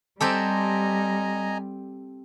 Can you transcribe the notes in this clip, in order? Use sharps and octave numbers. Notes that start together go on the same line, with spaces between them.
G3 C4 G4 A4 D#5 G#5 A#5